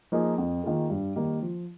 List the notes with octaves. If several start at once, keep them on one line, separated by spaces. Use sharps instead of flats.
F3 A#3 D#4 G#4
F2
D#3 A#3 F4 G#4
G2
D#3 G3 A#3
F3